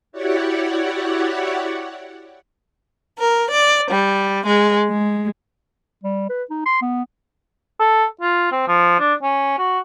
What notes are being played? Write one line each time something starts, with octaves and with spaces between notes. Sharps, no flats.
E4 F#4 G4 C#5 D5 F#5
A#4
D5
G3
G#3
G#3
G3
B4
D#4
C6
B3
A4
F4
C4
F3
D4
C#4
F#4